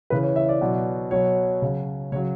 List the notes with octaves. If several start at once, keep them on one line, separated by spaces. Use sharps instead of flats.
C#3 E3 B4
C#5
E5
D5
B2 F#3
B2 F#3 C#5
C#3 F#3
C#3 F#3 C#5